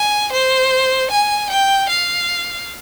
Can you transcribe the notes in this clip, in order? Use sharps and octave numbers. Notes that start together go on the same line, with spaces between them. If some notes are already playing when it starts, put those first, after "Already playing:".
Already playing: G#5
C5
G#5
G5
F5